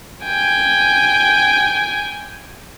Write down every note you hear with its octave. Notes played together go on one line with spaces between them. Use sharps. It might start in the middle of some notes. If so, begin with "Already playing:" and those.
G5 G#5